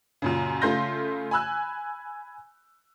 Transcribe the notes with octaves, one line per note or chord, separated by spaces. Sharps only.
F#2 A#2 C#3
C#3 A3 F4 C6 G6 A#6
G#5 B5 E6 F#6